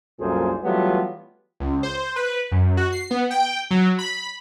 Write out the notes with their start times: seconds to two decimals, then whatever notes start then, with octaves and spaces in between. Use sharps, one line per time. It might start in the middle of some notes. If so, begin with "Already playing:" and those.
0.20 C2 F#2 A#2 G#4 A4 C5
0.64 E3 F#3 G3 A3 B3 F4
1.60 C#2
1.83 C5
2.16 B4
2.52 F#2
2.77 F#4
2.92 C7
3.11 B3
3.30 G5
3.71 F#3
3.99 B5